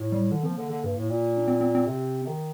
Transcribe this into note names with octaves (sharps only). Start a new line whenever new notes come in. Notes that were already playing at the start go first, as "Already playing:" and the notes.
Already playing: A2
G3
D3 D#3
F3 C4
A#3
D3
D3
G2
A2
A#2
D4
C4
C4
C4
C3
D#3